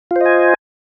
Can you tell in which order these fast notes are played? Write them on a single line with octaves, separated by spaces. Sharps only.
F4 C5 D#5 G#5